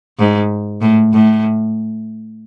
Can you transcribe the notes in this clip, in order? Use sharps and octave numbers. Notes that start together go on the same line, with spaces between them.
G#2
A2
A2